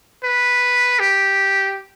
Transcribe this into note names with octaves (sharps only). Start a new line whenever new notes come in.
B4
G4